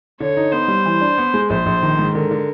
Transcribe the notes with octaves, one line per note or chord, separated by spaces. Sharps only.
D3 C#5
D#4
B3 C5
G3
E3
D4
B3
G#3
A#1 C5
A#1
D#3
G#2
D3 A#4
D3